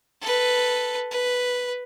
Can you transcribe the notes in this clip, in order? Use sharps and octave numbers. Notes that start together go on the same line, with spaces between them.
A4 B4
B4